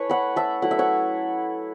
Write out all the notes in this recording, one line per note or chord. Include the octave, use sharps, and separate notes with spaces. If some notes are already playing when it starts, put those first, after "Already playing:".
Already playing: A3 C#4 E4 B4 C#5
F#5 B5
E5 A5
F#3 A3 E4 F#5
E5
C#5 F#5